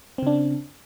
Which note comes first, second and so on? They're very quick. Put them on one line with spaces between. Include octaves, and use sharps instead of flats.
C4 C#3 D4